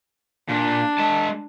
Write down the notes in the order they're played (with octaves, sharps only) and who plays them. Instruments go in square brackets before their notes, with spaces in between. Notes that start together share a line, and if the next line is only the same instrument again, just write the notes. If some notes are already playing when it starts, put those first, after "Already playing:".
[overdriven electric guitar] A#2 [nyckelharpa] D4
[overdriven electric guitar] G#3 A5